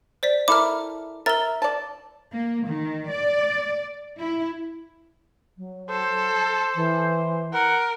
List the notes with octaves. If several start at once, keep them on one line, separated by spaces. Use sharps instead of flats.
C5 D5 B6
E4 A4 A#4 D6 F6
A#4 E5 A6 G7
D5 A5
A#3
D#3
D5
E4
F#3
A4 C5
E3
A#4 F#5